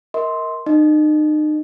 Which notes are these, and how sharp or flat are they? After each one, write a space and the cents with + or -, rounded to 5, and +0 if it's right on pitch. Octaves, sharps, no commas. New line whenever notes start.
A#4 +0 D#5 +40 C6 +0
D#4 -35 D#5 -25